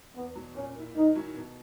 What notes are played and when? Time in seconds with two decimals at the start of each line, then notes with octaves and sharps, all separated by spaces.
0.15 E2 B3
0.35 B2 F#3
0.54 A#2 C#4
0.75 A#3 E4
0.94 D#3 D#4
1.15 F#3 C#4 E4
1.35 B2